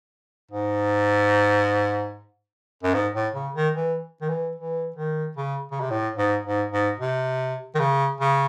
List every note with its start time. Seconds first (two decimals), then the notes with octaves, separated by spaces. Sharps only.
0.51 G#2
2.83 F#2
2.94 G#2
3.14 A2
3.34 C#3
3.55 D#3
3.75 E3
4.21 D#3
4.29 E3
4.56 E3
4.96 D#3
5.37 C#3
5.72 C#3
5.81 C3
5.90 A2
6.18 G#2
6.45 G#2
6.71 G#2
6.99 C3
7.75 D#3
7.79 C#3
8.20 C#3